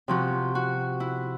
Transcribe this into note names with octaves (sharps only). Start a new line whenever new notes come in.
C3 F3 F#4
F#4
E4